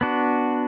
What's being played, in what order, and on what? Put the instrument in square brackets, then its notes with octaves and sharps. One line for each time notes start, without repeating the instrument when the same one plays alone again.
[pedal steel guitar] B3 D4 F#4